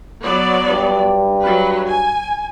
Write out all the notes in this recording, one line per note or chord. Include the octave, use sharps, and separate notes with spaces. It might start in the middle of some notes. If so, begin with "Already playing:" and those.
F#3 B3 D5
G2
F#3 B4
G#5